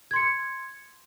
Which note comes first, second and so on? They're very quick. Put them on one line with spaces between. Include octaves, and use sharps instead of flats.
G#6 C6 C#7